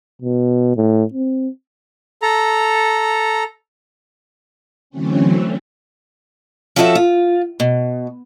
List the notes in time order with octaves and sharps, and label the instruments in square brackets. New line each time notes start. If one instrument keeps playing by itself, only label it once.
[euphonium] B2
A2
C4
[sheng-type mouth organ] A4 A#5
[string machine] D3 E3 F#3 A3 C4 C#4
[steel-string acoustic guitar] F3 C#4 F#4 A4 B4 E5
F4
B2